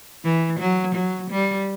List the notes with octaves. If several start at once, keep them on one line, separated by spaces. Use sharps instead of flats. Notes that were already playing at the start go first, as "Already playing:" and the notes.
E3
F#3
F#3
G3